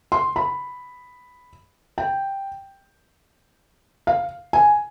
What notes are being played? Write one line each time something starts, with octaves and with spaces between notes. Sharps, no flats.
C6
B5
G5
F5
G#5